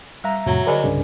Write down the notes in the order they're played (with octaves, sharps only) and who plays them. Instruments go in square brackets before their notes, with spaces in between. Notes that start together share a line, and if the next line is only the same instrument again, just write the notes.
[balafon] G3 [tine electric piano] E5 A#5
[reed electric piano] F2 A2 C3 [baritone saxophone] F#3
[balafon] D3 G#4 D#5 [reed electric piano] A#4 D5 G#5
[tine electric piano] C2 G2 C#3